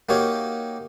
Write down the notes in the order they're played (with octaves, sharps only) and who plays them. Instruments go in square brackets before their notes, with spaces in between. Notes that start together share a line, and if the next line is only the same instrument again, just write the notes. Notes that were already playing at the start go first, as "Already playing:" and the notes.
[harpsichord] A#3 D#4 F#4 G4 C#5 F5